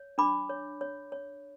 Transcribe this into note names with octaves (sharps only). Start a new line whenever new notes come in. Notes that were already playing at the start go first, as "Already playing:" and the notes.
Already playing: C#5
D4 B5 D6
C#5
C#5
C#5